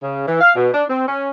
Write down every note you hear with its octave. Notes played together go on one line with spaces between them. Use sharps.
C#3
E3
F5
B2
D4
C4
C#4